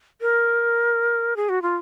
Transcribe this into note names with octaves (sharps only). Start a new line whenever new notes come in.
A#4
G#4
F#4
F4